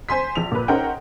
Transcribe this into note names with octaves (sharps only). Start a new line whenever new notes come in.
C5 G#5 C6 B6
A#1 F7
A#2 B4
C#4 D#4 A#4 C5 F#5 G5